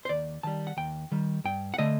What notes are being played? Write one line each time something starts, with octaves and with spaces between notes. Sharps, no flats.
C5
D#2 D5
D#3 G3 A5
F#5
D#2 G5
D#3 G3
G2 G5
F#5
D3 A3 D#5